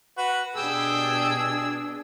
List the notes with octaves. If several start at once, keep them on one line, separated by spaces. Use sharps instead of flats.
F#4 B4
B2 D4 G4 G#4 E6